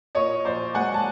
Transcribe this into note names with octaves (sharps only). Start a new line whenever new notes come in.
A#2 C#5 D#5
A#1 C5 D5
G#3 F#5 G#5
A5